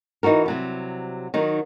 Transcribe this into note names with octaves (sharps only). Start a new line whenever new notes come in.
E3 D#4 E4 F#4 A#4
C3 F#3 G3
D#3 F#3 D#4